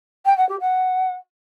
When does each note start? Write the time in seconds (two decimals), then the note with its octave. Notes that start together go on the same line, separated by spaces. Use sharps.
0.26 G5
0.37 F#5
0.49 G4
0.61 F#5